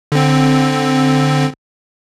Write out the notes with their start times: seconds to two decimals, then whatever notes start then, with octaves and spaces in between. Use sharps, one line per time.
0.12 D3 C4